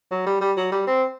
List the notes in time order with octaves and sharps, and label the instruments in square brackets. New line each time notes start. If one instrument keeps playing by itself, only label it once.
[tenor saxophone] F#3
G3
G3
F#3
G3
C4